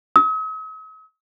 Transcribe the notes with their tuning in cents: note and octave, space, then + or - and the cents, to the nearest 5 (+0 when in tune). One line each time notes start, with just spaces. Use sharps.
D#6 +45